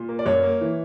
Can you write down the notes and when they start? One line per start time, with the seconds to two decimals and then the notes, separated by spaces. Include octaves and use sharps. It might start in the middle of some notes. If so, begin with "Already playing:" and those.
Already playing: A#2
0.09 A#3
0.19 D5
0.26 F#2 C#5
0.43 A#3
0.61 E3